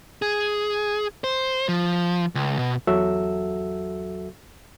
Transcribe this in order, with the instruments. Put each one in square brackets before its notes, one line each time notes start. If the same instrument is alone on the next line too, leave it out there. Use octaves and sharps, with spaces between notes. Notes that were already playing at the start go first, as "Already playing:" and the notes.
[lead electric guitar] G#4
C5
F3
C#2
B2
[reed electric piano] E2 F#3 F#4 A4 E5 E6